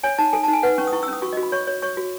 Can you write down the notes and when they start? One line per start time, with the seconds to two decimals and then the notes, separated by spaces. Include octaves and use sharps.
0.03 C#5 G#5
0.18 D#4 A5
0.33 A4 G#5
0.43 A5
0.48 D#4
0.53 G#5
0.63 B4 F#5
0.78 C#4 C#6
0.87 D#6
0.93 E4 C#6
1.03 E6
1.08 C#4 D#6
1.22 F#4 C#6
1.33 D#5
1.37 F#4
1.43 B5
1.52 C#5 C#6
1.67 C#5
1.82 C#5 C#6
1.97 F#4